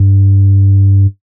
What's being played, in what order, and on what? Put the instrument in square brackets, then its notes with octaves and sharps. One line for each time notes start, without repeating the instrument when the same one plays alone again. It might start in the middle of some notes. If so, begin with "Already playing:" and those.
Already playing: [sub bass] G2